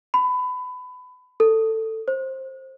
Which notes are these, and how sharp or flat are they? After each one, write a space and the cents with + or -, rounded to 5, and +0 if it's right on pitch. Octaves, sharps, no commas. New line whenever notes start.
B5 +25
A4 +15
C5 +20